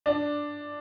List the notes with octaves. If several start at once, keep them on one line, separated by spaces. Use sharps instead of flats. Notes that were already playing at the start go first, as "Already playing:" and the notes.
D4